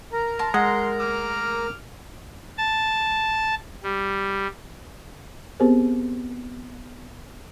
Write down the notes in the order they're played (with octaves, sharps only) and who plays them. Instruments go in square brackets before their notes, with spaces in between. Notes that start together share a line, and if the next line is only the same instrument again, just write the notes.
[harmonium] A#4 A#5
[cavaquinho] A5 C6
[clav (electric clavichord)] G#3 [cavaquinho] F#5 [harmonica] C6
[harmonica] D6 F6
[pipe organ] A5
G3
[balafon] B3 C4 G4 G#4 A#4 C5